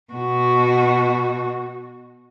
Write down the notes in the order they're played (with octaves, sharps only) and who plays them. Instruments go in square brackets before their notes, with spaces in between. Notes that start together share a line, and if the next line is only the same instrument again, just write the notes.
[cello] B2 F#4